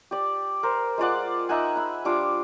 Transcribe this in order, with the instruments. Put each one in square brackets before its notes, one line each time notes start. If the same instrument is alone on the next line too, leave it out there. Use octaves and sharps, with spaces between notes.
[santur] G4 D5
A#4 C5
G#3 F4 D5 F#5
D#4 E5 F#5 G#5
E5 B5
G3 D4 F4 D6